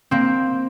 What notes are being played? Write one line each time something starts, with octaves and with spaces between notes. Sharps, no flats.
A#3 C4